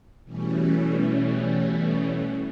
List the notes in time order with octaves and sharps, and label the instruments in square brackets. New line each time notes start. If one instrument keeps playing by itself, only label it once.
[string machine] B2 E3 G3 A3 C#4